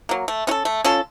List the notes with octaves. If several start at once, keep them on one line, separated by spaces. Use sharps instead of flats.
F#3 A#3
A3
C#4 F4 A4
A3
C#4 F4 A4